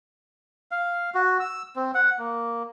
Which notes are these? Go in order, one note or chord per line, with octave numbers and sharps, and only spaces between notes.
F5
F#4
E6
C4
F#5
A#3